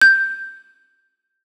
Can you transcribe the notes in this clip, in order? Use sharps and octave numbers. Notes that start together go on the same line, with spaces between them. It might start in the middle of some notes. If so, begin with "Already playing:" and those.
G6